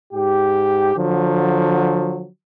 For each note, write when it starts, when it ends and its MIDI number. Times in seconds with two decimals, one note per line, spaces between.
0.14 0.96 44
0.14 0.96 67
0.96 2.27 50
0.96 2.27 53
0.96 2.27 54